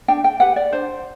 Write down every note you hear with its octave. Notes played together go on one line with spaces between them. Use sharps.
D4 G5
G5
G4 B4 F#5
D5
D4 C5